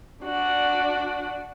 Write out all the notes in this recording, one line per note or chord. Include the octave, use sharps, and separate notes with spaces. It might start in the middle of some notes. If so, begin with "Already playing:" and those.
D4 F#4 D5